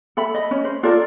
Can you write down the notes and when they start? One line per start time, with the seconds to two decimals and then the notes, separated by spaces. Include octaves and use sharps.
0.17 A4 E5 B5
0.34 D#5
0.51 C#4
0.65 C5
0.83 F4 A4 A#4 D5